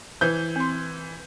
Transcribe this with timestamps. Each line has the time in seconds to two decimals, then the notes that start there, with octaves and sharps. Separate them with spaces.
0.21 E3 C5 G6
0.56 C4 C6